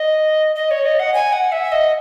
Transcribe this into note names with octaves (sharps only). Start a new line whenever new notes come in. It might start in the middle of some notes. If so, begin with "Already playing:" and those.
Already playing: D#5
D#5
C#5
D#5
F#5
G#5
F#5
E5
D#5